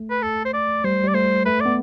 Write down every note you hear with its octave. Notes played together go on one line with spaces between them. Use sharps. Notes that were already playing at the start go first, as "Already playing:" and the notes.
Already playing: A3
B4
A4
C5
D5
G3 C5
G3 D5
A3 C5
A3 B4
B3 D5